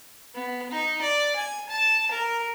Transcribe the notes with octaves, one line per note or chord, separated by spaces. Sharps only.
B3
D#4
D5
G#5
A5
A#4